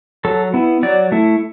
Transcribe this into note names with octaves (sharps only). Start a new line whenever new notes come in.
F#3 A4
B3 E4
F#3 D5
A3 E4